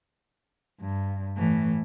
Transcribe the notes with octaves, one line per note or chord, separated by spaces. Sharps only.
G2
A2 E3